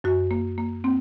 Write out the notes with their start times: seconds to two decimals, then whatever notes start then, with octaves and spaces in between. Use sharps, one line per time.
0.04 F#2 F#4
0.31 A#3
0.58 A#3
0.84 A#3 C4